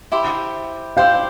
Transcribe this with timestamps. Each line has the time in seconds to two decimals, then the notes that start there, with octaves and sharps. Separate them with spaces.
0.12 E4 G4 C5
0.97 E4 G4 C5 F5